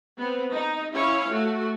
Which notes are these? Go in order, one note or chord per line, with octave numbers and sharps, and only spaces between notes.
B3 C4
D#4
C#4 E4 C#5 F5
A3 F#4